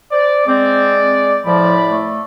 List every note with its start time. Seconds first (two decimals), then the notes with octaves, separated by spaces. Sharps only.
0.11 C5 D5
0.47 G#3 C4 D5
1.46 A2 F3 D5 B5
1.90 A3